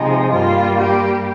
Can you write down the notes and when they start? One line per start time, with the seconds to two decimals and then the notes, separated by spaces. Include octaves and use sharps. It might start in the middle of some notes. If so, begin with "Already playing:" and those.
Already playing: C3 F3 G#3 D#4
0.33 G2 G3 A#3 F4
0.79 G4